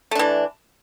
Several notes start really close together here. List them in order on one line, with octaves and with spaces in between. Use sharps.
A3 D4 E3